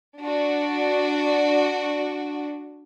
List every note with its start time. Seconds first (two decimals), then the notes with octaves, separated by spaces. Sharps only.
0.19 D4 F#4